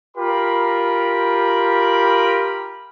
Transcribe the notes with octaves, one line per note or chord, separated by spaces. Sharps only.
F4 G4 A#4 B5